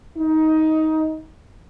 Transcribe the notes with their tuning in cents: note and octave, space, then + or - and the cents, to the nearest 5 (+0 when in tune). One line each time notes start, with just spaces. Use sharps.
D#4 +15